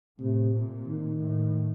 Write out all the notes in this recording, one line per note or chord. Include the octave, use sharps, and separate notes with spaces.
A2 C3
A#2
D#3
A2